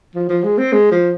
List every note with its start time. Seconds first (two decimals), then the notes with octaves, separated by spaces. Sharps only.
0.15 F3
0.29 F3
0.44 G#3
0.58 C4
0.72 G#3
0.91 F3